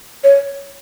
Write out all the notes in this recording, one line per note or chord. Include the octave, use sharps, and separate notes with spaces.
C#5